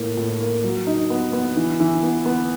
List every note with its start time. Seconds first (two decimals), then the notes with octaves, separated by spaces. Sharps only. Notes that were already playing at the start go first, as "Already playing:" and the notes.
Already playing: A2 A#3
0.17 A2
0.40 A#3
0.64 F#3
0.87 D#4
1.10 B3
1.33 B3
1.56 E3
1.80 E3
2.03 B3
2.26 B3